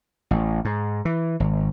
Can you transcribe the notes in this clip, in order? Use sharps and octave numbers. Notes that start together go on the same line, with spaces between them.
A1
G#2
E3
G#1